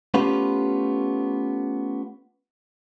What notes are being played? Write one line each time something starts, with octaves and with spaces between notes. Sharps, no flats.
A3 B3 C#4 F4 G4 B4